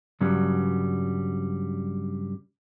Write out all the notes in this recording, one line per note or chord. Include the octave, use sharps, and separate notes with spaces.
G2 C#3 F#3 G3